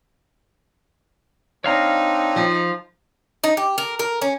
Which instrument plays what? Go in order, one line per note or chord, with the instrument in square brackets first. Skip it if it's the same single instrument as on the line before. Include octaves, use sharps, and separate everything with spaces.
[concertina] C4 D4 [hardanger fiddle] D#4 [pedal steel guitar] C#5 F5 A#5
[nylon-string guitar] F3
[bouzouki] D#4
G4
A#4
A#4
C#4